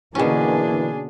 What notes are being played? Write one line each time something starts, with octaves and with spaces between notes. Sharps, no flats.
B2 D3 E3 A#3 C#4 D4 G#4